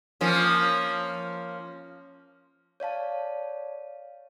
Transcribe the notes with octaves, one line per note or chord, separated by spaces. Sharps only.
F3 A#3 C#4
C#5 D5 F5 A5